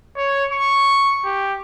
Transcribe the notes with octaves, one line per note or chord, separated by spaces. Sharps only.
C#5
C#6
G4